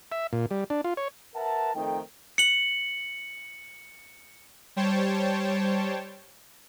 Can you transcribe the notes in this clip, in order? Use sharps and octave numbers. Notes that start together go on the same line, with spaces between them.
E5
A#2
G3
D4
F4
C#5
A#4 B4 E5 F#5 A5
F2 D#3 A3 D#4 G5
C#7 F#7
G3 C5 C#5 G5 A5